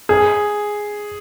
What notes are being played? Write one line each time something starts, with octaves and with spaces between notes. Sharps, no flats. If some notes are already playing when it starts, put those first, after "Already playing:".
G#4